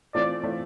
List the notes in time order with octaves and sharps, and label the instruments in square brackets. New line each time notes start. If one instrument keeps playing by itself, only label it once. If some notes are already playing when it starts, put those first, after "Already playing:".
[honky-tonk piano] E3 A3 C4 F4 [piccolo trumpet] D5
[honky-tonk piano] E3 A3 C4 F4